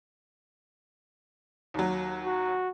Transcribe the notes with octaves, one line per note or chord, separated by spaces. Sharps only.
D#2 F#3
F#4